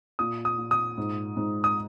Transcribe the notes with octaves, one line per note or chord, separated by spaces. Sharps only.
A#2 D#6
D#6
A#2
D#6
G#2
G#2
D#6